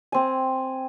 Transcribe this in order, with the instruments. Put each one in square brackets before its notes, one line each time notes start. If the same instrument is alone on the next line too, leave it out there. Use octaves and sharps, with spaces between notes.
[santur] C4 G#5